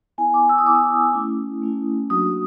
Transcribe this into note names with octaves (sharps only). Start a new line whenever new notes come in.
B3 E4 G#5
D6
E6
D#6
B3 E4 D6
D#6
A3 C#4 E4
A3 C#4 E4
F#3 A#3 D4 F#4 D#6